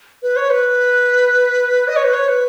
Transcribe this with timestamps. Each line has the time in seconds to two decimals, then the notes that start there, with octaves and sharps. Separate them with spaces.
0.22 B4
0.36 C#5
0.50 B4
1.88 D#5
1.96 C#5
2.04 B4
2.13 C#5
2.28 B4